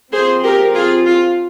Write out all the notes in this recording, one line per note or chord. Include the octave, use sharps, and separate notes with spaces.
F3 C4 G#4 C5
G4 A#4
F4 G#4
F4